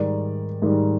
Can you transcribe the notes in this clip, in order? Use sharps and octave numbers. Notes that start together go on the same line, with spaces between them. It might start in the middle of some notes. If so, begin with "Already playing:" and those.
Already playing: G#2 D#3 G3 D5
G#2 D#3 G3